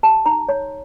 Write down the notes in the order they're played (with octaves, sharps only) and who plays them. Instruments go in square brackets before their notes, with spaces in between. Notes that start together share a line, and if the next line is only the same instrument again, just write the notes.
[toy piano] G4 A5
D#4 A#5
C#5 C6